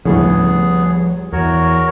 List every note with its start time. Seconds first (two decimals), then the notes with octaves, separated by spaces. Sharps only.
0.05 D2 A2 C#3 F3 G3 B3 G#4
1.32 E2 E3 F#4 A#4 C#5